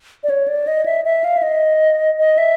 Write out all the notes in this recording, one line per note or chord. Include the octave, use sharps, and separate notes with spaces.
D5
C#5
D5
D#5
E5
E5
F5
E5
D#5
D#5
E5